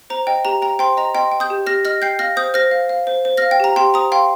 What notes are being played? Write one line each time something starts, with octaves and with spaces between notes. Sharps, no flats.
C5 A#5
D#5 G5
G4 A#5
G5 A#5
C5 G5 C6
D#5 A#5
D#5 G5 C6
G5
D#6 G6
G4
G4 F6 A#6
D#5 F6 A#6
G5 G6 C7
F5 F6 A#6
C5 D#6 G6
C5 F6 A#6
F5
F5
C5
C5
F6 A#6
F5
G5
G4 A#5
G4 G5 C6
C5 A#5 D#6
F5 G5 C6